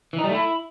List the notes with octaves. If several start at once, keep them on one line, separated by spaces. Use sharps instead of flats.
E3
D#4
G3
A3
E4